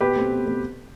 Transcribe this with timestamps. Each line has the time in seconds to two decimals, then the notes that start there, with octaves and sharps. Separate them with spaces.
0.01 B2 G4 B4
0.16 A3 C4
0.31 B2
0.45 A3 C4